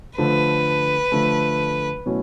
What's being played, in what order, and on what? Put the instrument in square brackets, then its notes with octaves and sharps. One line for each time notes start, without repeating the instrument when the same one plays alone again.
[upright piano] D3 F3 A3 [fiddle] B4
[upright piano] D3 F3 A3
B2 F#3 A3 C#4 E4